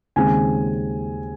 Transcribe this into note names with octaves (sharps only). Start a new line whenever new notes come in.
D#2 C#3 G#3 C4 G#5